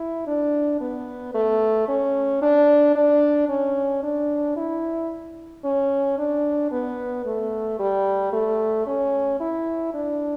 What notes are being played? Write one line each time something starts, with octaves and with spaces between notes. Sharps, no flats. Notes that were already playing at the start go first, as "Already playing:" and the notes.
Already playing: E4
D4
B3
A3
C#4
D4
D4
C#4
D4
E4
C#4
D4
B3
A3
G3
A3
C#4
E4
D4